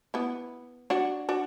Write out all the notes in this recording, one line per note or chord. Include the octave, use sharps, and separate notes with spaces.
B3 E4
D4 F#4
D4 F#4